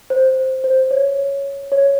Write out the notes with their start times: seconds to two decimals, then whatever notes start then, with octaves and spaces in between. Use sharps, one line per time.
0.10 C5
0.64 C5
0.91 C#5
1.72 C#5